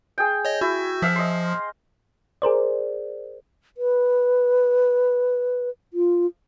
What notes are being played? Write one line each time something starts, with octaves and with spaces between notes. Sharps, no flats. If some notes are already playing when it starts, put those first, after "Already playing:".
G#4 G5
C#5 D#5
E4 F#4
F3 E5 F5
D#5 C6
G#4 A#4 C5 D5
B4
F4